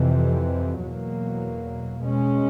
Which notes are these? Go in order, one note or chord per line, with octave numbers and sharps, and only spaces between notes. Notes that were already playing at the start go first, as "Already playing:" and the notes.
Already playing: F2 C3 E3
E2 B2 F#3 A#3
B2 G#3 C#4